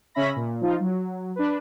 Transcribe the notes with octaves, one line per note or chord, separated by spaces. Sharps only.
C#3 C#4 E5 B5 A#6
A#2
F3 D#4 F4
F#3
D4 B4